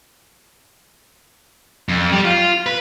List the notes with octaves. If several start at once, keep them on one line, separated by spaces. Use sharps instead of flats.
F2
G3
F4
B4